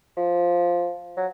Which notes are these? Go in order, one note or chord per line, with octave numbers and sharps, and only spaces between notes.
F3
F#3